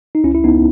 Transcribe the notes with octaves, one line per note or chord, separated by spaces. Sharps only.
D#4
C#2 C#4 E4
E4
C#2 B3 D#4